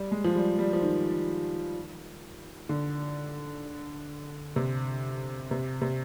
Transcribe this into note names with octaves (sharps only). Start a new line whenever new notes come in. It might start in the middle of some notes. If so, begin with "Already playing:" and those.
Already playing: G3
G#3
F3
G3
G3
F3
D#3
D3
C3
C3
C3